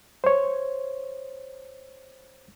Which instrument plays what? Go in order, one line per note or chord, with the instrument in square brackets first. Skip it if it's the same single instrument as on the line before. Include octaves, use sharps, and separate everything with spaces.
[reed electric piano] C5 C#5